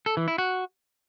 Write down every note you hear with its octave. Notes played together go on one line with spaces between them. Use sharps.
A4
E3
E4
F#4